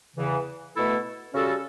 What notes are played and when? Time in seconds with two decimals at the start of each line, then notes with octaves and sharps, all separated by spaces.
0.16 E2 C#3 E3
0.75 B2 A3 E4 A4
1.34 C#3 G3 C#4 F#4 A4